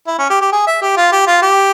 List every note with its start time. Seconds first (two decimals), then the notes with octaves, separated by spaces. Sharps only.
0.07 E4
0.19 C#4
0.30 G4
0.41 G4
0.52 G#4
0.67 E5
0.82 G4
0.97 F4
1.12 G4
1.27 F4
1.42 G4